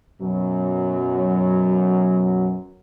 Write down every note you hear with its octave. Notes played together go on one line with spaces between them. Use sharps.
F#2 B2 F#3